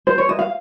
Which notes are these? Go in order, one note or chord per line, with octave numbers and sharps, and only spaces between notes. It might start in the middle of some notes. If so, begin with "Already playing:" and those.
C5
C#5
D#5
F5